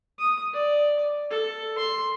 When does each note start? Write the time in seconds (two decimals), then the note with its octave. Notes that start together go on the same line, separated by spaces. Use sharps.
0.19 D#6
0.53 D5
1.31 A4
1.78 C6